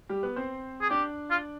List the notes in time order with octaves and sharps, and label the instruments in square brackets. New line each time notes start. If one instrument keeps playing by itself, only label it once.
[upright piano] G3 G4
B3 B4
C4 C5
[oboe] G#4
[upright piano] D4 D5 [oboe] G4
[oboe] F4